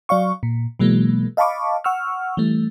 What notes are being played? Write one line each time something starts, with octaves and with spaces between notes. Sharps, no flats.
F#3 D5 F5 C#6
A#2
B2 E3 F#3 G#3 A#3
D#5 F5 A5 B5 C#6 D6
F#5 C#6 E6 F6
E3 G3 A3